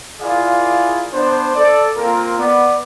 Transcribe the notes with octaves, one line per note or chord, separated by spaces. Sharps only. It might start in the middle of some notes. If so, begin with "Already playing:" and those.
E4 F4 G#4 A#4 D5 F5
B3 D4 C5
A4 D5
A#3 C4 F4 A#4
B3 D5